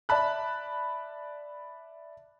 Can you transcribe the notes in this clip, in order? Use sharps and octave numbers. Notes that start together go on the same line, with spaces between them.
D5 E5 A5 B5 F#6